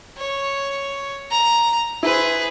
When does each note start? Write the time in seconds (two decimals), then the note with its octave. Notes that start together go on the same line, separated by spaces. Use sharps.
0.18 C#5
1.31 A#5
2.03 E4 G#4 B4 C5